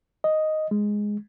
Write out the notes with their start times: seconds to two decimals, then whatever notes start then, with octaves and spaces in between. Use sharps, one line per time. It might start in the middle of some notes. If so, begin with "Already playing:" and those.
0.24 D#5
0.71 G#3